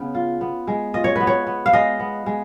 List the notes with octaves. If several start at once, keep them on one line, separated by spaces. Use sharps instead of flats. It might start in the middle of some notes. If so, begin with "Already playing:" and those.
Already playing: C#3 B3
F4
B3
G#3
F4 D#5
C#5
B3 B4
C#5
B3
F5
G#3 D#5
B3
G#3